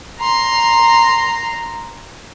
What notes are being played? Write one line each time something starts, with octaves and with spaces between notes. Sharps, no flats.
A#5 C6